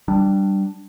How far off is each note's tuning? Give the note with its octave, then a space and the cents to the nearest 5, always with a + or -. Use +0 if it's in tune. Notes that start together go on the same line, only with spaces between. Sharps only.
G3 -10 D4 +0